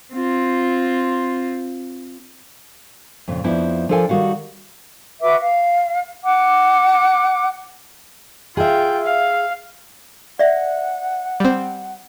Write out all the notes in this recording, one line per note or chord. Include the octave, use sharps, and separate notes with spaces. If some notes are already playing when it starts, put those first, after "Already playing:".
C4 F4
F2 A#2 C#3
F2 F3 B3 D4 E4
F3 D4 F4 A4 A#4 G#5
D#3 G3 F#4 F5 F#5
F#4 B4 E5 D6
F5
F#5 D6
F4 G#4 E5 G5
F5
D5 E5 F#5
G3 C4